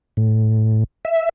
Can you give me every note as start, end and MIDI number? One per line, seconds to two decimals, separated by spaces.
0.17 0.84 45
1.05 1.29 76